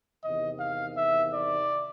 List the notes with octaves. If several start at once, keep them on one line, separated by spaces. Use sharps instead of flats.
E2 C3 D#3 D#5
F5
E5
D5